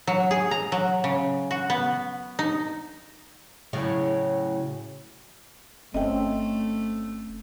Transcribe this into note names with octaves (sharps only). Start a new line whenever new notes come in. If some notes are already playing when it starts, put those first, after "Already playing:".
F#3
G#4
A#5
F#3
C#3
F#4
B3
D#4
A2 C#3 F#3
G1 A3 C4 C#4 A4 D#5 E5 G5